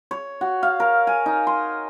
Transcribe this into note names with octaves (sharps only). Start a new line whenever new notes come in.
C#5
F#4
F5
A#4
G#5
D#4
C6